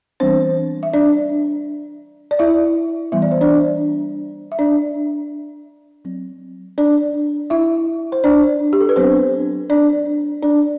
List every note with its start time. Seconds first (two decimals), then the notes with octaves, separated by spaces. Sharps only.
0.20 E3 G3 B3 C4 D4 C5
0.83 E5
0.93 D4 D5
2.31 D5
2.39 E4 E5
3.12 E3 G3 B3 E5
3.22 D5
3.31 C5
3.41 D4 D5
4.52 E5
4.59 D4 D5
6.05 F#3 C4
6.78 D4 D5
7.50 E4 E5
8.12 C5
8.24 D4 D5
8.73 G4
8.80 A4
8.89 B4
8.96 F#3 B3 C4 D4 C5
9.70 D4 D5
10.43 D4 D5